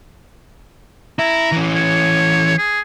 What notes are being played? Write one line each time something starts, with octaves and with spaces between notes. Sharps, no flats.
E4 A#5
E3 C#4
C#5
G#4